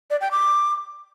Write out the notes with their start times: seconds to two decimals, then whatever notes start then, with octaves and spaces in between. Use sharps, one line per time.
0.10 D5
0.21 G5
0.31 D6